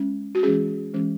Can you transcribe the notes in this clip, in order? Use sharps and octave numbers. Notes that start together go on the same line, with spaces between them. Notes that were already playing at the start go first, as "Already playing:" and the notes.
Already playing: G#3 C#4
F#4
E3 G#3 C#4 G#4
E3 G#3 C#4